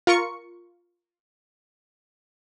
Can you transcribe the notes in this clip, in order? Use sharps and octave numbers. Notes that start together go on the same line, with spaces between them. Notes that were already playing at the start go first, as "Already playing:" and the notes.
F4 A#4 C#6 C#7